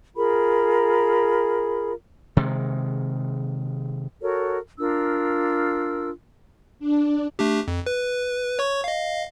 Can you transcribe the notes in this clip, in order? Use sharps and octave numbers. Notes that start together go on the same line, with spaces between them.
F4 G#4 A#4 B5
C3 D#3 G#3
F#4 A4 A#4 C#5
D4 F4 A#4 E6
D4
A3 D4 G4
F2
B4
C#5 C#6
D#5 F5